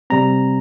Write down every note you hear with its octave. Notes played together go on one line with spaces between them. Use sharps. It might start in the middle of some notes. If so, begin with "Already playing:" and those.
C3 G3 C4 A#5